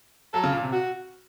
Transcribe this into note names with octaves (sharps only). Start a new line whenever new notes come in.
F#3 A4
C#3
A#2
C3
F#4